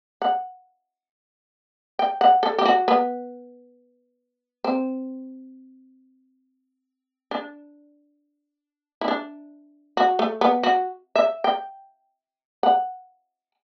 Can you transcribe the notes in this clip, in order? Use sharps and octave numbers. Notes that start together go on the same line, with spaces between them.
F#5
G5
F#5
A4
G4
F#4
B3
C4
D4
E4
D4
F#4
A3
B3
F#4
E5
G5
F#5